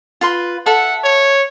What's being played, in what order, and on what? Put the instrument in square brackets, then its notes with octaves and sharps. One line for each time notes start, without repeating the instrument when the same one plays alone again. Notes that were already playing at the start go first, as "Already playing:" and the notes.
[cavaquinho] F4 B4 C6
[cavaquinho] A4 E5 [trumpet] F#5
[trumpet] C#5